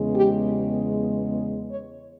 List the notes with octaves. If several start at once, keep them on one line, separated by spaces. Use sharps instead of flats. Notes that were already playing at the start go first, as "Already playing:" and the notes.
Already playing: E2 C#3 G#3 B3
G4
C#5